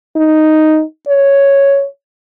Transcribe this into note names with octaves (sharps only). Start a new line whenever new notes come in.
D#4
C#5